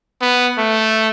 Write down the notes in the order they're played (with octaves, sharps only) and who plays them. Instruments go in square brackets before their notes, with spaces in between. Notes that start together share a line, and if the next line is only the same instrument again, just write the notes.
[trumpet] B3
A3